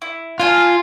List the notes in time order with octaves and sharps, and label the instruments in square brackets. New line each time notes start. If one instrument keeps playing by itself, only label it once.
[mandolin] E4
[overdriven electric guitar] F4 [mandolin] F5 G#5 A5